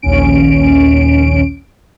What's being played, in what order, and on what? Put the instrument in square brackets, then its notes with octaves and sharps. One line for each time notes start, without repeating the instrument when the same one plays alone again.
[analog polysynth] A#1 D#2 C#4 D7